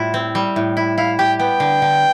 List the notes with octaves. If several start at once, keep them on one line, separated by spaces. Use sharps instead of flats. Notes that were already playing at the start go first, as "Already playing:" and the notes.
Already playing: A2 G3 E4 F4
C4
G3
A2
E4
E4 F5
G4 G5
B3 G5
D3
D3